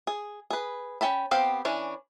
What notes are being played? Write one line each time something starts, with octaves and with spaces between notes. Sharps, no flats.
G#4
G#4 B4
C#4 G5 A5 B5
B3 C4 G4 F5 G5
E3 C#4 D4